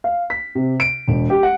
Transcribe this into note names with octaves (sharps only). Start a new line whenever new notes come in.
F5
B6
C3
D7
E1
G4
F#5